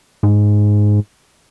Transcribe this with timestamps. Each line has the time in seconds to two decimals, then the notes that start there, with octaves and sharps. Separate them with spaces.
0.23 G#2